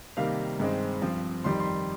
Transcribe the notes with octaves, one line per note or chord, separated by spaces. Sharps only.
C3 D#3 G3 A#3 F5
G2 D#3 G#3 C4
G2 F3 C4
F2 D#3 G3 C6
C6